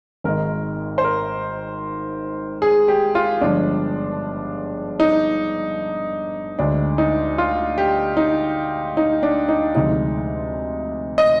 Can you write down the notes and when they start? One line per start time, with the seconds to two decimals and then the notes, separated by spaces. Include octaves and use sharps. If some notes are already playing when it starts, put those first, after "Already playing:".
0.24 G#1 G#2 D#3 G#3 A#4
0.98 C5
1.04 A#4
2.62 G#4
2.88 G4
3.15 F4
3.41 G1 G2 F3 G#3 D4
5.00 D#4
6.59 D2 D3 G#3 D4
6.98 D#4
7.38 F4
7.78 G4
8.17 D#4
8.97 D#4
9.23 D4
9.49 D#4
9.75 D2 C3 F3 G#3 D#4
11.18 D#5